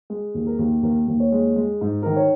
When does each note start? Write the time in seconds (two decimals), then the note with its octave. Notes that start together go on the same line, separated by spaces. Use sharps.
0.10 G#3
0.34 D#2
0.47 A#4
0.59 D#2
0.83 D#2 A#4
1.07 D#2
1.20 C#5
1.32 G#3
1.56 G#3
1.81 G#2
2.03 D#3 A#4
2.16 C#5